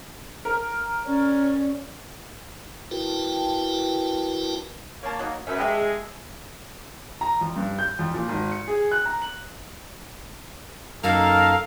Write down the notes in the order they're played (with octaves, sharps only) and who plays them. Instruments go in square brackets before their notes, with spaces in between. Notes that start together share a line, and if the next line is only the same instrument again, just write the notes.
[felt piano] A#4
[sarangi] C#4 [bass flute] D5
[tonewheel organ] E4 F#4 A#4 B4 G5 A5
[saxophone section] A#3 [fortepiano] C#5 A5
[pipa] F#3 D#4
[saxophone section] F#2 [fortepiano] B4 G#5 [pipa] E5
[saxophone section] G#3 [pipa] G4 A4 E5
[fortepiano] G#4
[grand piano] A#5
F2
G2
G6
F2
A#2
G#1
C#7
G#4
F#6
A#5
F#7
[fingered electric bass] F#2 [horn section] A#3 D#4 A#4 [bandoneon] A4 A5 [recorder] F5